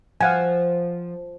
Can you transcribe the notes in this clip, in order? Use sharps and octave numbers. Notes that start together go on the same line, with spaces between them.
F3 F5 F#5 G#5